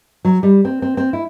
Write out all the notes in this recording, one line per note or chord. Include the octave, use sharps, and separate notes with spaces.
F#3
G3
C4
C4
C4
E4